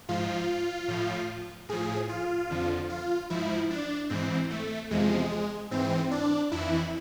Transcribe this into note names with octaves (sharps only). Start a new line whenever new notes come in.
G#2 F3 F4
A2 F3
A2 F3 G#4
F4
F2 D3 F3
F4
G#2 F3 E4
D4
G#2 E3 C4
A3
E2 C3 F3 G#3
G#2 E3 C4
D4
F2 E3 E4